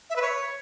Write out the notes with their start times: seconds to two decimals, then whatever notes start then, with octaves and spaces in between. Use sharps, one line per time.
0.10 E5
0.16 B4
0.22 C#5